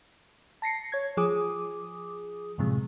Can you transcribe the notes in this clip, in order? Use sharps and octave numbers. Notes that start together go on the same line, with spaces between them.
A5 A#6 C7 C#7
C#5 G#6
F3 G#4 D6 D#6
F#2 A2 C3 F3 G#3